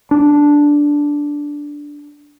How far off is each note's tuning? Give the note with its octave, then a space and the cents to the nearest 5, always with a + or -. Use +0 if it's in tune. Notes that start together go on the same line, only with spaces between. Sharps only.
D4 -5